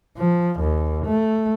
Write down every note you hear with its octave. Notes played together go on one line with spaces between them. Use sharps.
F3
D#2
A3